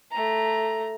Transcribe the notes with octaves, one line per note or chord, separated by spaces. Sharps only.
A3 A#5